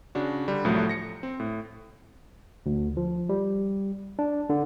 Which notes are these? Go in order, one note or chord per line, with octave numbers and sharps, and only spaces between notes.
C#3 D4 F#4
D3 G3
C2 A2 F3 F#3 A3
A#6 C#7
C4
A2
D2
F3
G3
D4
D3